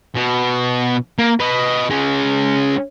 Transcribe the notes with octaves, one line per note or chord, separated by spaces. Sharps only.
B2
A#3
B4 D#5
G#3 C#4